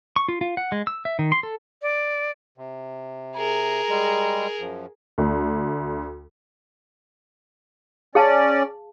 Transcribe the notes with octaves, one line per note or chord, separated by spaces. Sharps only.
C#6
F4
F4
F#5
G#3
E6
E5
D#3
C6
A4
D5
C3
G#4 A#4 A#5
G3 G#3
F#2 F3
D2
C#4 G#4 D5 F5 A5